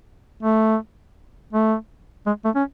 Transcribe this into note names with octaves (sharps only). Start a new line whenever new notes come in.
A3
A3
G#3
A3
C#4